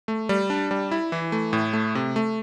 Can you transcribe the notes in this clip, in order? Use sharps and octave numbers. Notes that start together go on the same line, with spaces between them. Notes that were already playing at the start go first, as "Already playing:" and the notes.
A3
G3
D4
G3
E4
E3
A3
A2
A3
C3
A3